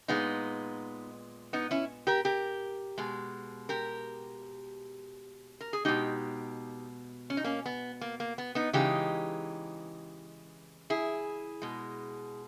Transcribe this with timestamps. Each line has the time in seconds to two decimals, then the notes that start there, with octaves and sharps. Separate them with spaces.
0.08 A#2 G#3 B3 D#4
1.53 B3 D#4
1.71 C#4 E4
2.07 G4 A#4
2.25 G4 A#4
2.98 B2 G#3
3.69 G4 A#4
5.61 A#4
5.73 G#4
5.85 B2 G#3 D#4 G4
7.30 C#4
7.37 D#4
7.44 A#3 C#4
7.66 B3
8.01 A#3
8.20 A#3
8.38 B3
8.55 B3 D#4
8.73 C#3 E3 G#3 D#4 G4
10.90 E4 G#4
11.62 B2 G#3